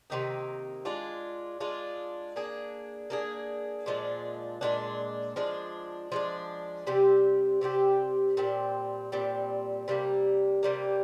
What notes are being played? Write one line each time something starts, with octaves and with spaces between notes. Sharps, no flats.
C3 D#3 A#3 D#4
G#3 D4 F4
G#3 D4 F4
A#3 D4 G#4
A#3 D4 G#4
A#2 F3 G#3 D4
A#2 F3 G#3 D4
F3 G#3 D4
F3 G#3 D4
C3 G3 C4 G4
C3 G3 C4 G4
A#2 G3 C4
A#2 G3 C4
C3 G3 A#3
C3 G3 A#3